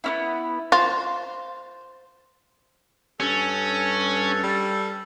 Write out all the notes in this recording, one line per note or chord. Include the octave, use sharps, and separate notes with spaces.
B3 C#4 E4
F4 C5
G2 C#4 A4
G3